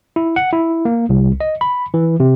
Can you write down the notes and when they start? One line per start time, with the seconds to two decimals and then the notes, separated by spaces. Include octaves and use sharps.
0.16 E4
0.36 F#5
0.53 E4
0.85 A#3
1.09 C2
1.41 D#5
1.61 B5
1.94 E3
2.20 C3